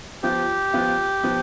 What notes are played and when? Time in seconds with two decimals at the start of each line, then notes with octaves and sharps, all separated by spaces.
0.23 F3 B3 F4 G4
0.73 F3 B3 F4
1.23 F3 B3